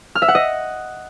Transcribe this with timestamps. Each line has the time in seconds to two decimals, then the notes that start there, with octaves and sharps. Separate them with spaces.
0.15 F6
0.22 E5
0.28 F#5
0.35 D#5